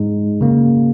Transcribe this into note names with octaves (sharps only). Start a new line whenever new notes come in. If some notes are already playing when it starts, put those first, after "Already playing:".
Already playing: G#2 G#3 D#4
C#3 A#3